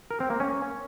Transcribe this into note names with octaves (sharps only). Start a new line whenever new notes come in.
A#4
C4
A#3
C#4